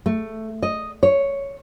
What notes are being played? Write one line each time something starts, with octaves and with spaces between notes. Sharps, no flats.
A3
D#5
C#5